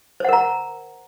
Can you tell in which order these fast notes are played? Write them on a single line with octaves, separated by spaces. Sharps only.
C5 F#5 A#4 A#5